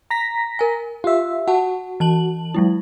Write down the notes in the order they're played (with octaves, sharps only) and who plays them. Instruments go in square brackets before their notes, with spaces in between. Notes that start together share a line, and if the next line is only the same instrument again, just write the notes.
[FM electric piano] A#5 A#6 B6
[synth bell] A#4 G#5
[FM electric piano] F4 E5 [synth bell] G4
[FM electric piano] F#4 [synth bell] F#5 A5
[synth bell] E3 A5 F#7
F#3 G#3 E4